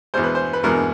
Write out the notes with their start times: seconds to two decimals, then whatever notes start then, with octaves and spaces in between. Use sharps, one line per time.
0.14 E2 B2 G#3 C5
0.24 B4
0.35 C5
0.53 B4
0.64 E2 B2 G#3 A#4